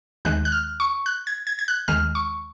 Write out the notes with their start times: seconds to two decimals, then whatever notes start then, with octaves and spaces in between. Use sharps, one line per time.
0.25 D#2 D#3 G#3 F#6
0.45 F#6
0.52 F6
0.80 C#6
1.06 F#6
1.27 G#6
1.47 G#6
1.59 G#6
1.68 F#6
1.88 D#2 D#3 G#3 F6
2.15 C#6